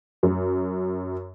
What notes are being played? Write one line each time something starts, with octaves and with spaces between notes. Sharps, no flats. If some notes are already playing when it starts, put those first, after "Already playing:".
F#2